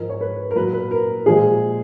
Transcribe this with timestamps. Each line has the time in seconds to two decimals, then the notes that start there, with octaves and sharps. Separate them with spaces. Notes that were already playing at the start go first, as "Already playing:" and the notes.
Already playing: G#2 F3 G#3 A#4
0.09 C#5
0.21 B4
0.51 A#4
0.56 A#2 F#3 B4
0.73 B4
0.91 A#4
1.26 A#2 F3 G#3 G#4